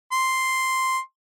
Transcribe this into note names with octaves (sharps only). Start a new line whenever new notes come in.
C6